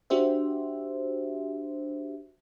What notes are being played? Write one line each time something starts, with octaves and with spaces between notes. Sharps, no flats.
D4 F#4 G4 C5 E5